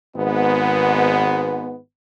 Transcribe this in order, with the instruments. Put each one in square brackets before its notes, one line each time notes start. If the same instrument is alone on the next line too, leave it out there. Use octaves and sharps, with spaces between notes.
[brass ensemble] G#1 G#2 B3